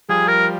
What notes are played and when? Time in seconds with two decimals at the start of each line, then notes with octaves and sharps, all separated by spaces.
0.09 F3 G3 G#4
0.28 A#4